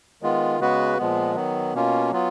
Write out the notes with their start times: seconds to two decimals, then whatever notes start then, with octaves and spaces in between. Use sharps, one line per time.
0.22 D#3 G#3 B3 F4
0.60 C#3 G#3 B3 F#4 B4
0.98 A#2 F3 G#3 B3
1.35 D#3 F#3 B3
1.74 B2 A#3 C#4 F4
2.11 F#3 B3 F4